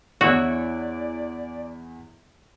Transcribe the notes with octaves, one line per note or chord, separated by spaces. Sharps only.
E2 E4 F#4 C#5 D5 F#6 E7